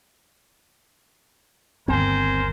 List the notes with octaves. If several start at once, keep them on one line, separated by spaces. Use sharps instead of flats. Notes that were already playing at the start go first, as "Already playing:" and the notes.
G1 D#2 C4 A#4 C5 G#5